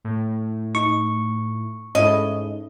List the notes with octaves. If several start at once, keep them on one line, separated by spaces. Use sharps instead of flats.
A2
D#4 C#6
G#2 C#4 E4 A4 D#5